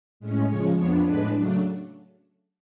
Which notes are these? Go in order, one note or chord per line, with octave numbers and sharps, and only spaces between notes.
A2 G#3 C#4
C#3 F3 G#3 C#5
F2 F3 B3 D4 C#5
A2 G#3 D4 B4
C#3 F#3 A3 D4